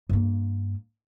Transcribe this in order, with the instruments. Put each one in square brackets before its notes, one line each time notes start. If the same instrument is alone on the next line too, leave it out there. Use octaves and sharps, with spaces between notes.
[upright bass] G2 A#3